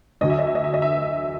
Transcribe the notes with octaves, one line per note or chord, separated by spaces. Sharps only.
D2 D3 F#3 D#5
E5
D#5
E5
D#5
E5
D#5
E5